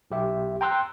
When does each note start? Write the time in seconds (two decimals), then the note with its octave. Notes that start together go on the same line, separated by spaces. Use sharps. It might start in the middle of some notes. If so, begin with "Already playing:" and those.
0.11 B1 G4 E5
0.61 G5 A#5 C6 E6 F#6